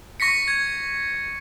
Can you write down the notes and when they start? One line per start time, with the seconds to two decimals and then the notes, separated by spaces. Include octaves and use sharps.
0.20 C#6 A#6 B6 C#7
0.48 G#6